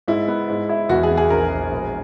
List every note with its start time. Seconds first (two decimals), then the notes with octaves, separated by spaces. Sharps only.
0.08 G#2 E4
0.28 B3
0.49 G#2
0.69 E4
0.89 E2 F#4
1.03 G#4
1.11 B3
1.17 G#4
1.30 A#1 A#4
1.51 A#1
1.71 E1